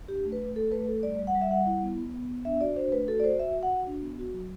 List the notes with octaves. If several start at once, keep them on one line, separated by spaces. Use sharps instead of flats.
D4 G4
A3
B4
A3
A3 A4
A3 B4
A3 A4
G3 D5
G3
F#5
G3
E5
G3 F#5
E4
B3
B3
B3
B3
D4 E5
F#4 D5
D4 C5
A3 B4
F#4 A4
D5
F#4 C5
F#4 E5
F#4
F#5
F#4
D4
B3
F#4
F#3